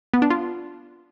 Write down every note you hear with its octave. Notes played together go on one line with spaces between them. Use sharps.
B3
D4
F4